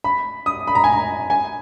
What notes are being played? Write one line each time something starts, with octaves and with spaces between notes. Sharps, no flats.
B5
D#6
B5
A#5
G#5
A#5
G#5